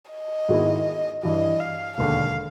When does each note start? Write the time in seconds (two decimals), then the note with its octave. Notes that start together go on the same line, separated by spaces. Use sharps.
0.11 D#5
0.49 G#2 D#3 G#3 B3 E4
1.23 G2 E3 G3 D#5
1.60 F5
1.97 E1 D#2 D3 F5